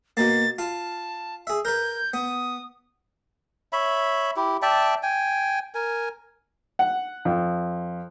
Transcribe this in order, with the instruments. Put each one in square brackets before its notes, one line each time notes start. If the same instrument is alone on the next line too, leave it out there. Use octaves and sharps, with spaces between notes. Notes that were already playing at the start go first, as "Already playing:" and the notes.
[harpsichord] B2 A#3 [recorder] A6
[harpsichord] F4 [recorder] A5
[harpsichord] G#4 E5
[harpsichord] A#4 B4 [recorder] G6
[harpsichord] B3 [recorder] D#6
[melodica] C#5 E5 B5
E4 G4
D5 E5 G5 A5
G5 G#5
A#4 G#5
[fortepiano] F#5
F2